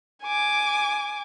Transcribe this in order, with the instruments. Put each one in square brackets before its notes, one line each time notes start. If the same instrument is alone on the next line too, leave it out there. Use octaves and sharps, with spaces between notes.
[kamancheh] G#5 D6